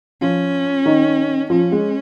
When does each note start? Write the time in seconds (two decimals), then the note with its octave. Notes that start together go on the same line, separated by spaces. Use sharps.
0.21 F3 C#4 F4
0.86 D#3 D#4
1.50 F3 C#4 F4
1.72 G#3 G#4